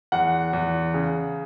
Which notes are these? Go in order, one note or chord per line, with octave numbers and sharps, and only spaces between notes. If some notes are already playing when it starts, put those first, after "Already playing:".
E2 F#5
E2
C#3